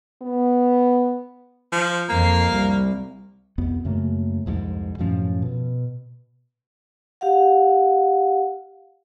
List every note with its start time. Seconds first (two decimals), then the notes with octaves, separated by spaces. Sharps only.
0.22 B3
1.72 F3
2.09 F2 A#3 C7
2.52 C2
3.58 C2 F2 B3
3.85 F#2 C#3 A3 A#3
4.46 C2 F2 G#2
4.99 F#2 A2 F3 C#4
5.42 B2
7.21 G4 F5 F#5